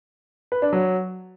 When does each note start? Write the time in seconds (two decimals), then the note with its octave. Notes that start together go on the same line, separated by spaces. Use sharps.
0.52 B4
0.62 D4
0.73 F#3